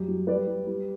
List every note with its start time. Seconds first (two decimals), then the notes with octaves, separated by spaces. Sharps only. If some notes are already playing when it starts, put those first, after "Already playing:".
Already playing: F#2 G3 G4
0.08 F#3
0.27 G3 B4 D5
0.47 G3
0.67 G3